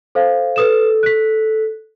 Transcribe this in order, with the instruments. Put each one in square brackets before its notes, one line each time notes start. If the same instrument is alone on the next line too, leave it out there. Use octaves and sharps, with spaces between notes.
[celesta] A4 C5 F5
[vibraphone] A4 [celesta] B4 D#6 E7
[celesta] F#6 B6